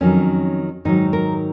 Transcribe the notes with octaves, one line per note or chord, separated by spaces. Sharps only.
F2 D#3 F#3 C#4
G#2 D#3 F#3 D#4
A#4